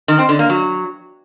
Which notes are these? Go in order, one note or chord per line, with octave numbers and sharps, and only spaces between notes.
D#3
C4
D3
A#3
F#3